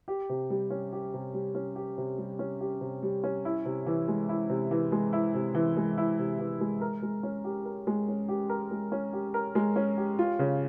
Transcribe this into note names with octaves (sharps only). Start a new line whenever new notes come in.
G4
C3
G3
C#4
G4
C3
G3
C#4
G4
C3
G3
C#4
G4
C3
G3
C#4
E4
C3
E3
G#3
E4
C3
E3
G#3
E4
C3
E3
G#3
E4
C3
E3
G#3
A#4
G#3
C#4
G4
A#4
G#3
C#4
G4
A#4
G#3
C#4
G4
A#4
G#3
C#4
G4
F4
C#3